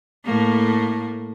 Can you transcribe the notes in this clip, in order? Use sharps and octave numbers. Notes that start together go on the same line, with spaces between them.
A2 A3 A#3